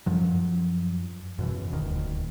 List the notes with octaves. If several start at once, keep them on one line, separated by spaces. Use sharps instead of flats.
F#2 F3 F#3
F#2 B2 E3
D#1 D2 D#3